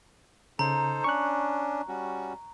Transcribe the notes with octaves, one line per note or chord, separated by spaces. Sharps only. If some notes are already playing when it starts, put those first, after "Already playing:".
C#3 D#4 A4 C5 A#5
C#4 D4 C#6 F#6
G3 C#4 F#4